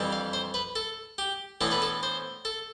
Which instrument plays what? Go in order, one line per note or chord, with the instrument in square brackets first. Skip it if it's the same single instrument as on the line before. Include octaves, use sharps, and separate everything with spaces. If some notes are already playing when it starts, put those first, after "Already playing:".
Already playing: [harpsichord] F2 E3 G3 D4
F5
C5
B4
A4
G4
A2 E3 B3 D4 A4
B4
A4
C5
A4